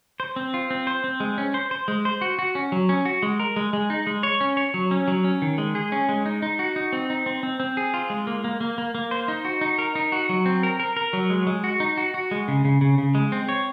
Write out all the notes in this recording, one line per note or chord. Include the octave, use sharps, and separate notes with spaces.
C5
C4
F4
C4
C5
C4
G#3
C#4
C5
C5
G#3
C5
F#4
F#4
C#4
F#3
C#4
F#4
G#3
A#4
G#3
G#3
D#4
G#3
C#5
C#4
C#5
F#3
C#4
F#3
C#4
D#3
G#3
G#4
C#4
G#3
D#4
D#4
F#4
D#4
C4
D#4
C4
C4
C4
G#4
F4
G#3
A#3
A#3
A#3
A#3
A#3
C5
D#4
F#4
D#4
A#4
D#4
F#4
F#3
C4
A#4
A#4
A#4
F#3
G#3
G#3
F#4
D#4
F#4
F#4
G#3
C#3
C#3
C#3
C#3
G#3
C4
C#5